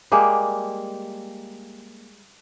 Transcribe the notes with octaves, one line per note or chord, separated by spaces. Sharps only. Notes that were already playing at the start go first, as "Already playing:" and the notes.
G3 G#3 A#3 G4